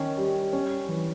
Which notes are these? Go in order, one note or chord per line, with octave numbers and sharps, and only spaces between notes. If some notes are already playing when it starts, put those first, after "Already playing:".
Already playing: D#3 C#4
G3
C#4
E3